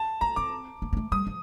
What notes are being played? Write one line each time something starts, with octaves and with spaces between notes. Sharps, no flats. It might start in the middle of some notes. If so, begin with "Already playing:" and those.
Already playing: A5
A#3 A#5
C4 D6
A#3
A#3
A3
G3 D#6
F3